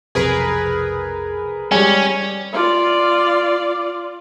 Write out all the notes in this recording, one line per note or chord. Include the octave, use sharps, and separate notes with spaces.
B1 F2 C3 G#4 A#4 B4
G3 G#3 C#4 G#5
F4 D5